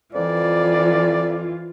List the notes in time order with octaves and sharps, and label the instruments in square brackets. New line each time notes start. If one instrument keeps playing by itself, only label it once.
[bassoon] F2 [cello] E3 F4 [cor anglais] D5